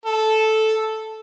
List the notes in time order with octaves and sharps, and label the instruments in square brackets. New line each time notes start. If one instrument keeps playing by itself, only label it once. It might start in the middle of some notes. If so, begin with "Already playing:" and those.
[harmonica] A4